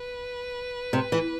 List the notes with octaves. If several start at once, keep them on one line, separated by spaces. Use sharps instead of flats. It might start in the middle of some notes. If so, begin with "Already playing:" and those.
Already playing: B4
C3
E3